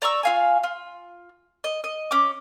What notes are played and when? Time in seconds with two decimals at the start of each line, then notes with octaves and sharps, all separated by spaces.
0.02 D5 A#5 C#6 E6
0.23 F4 F5 G#5
0.64 F4
1.64 D#5
1.84 D#5
2.11 C#4 D6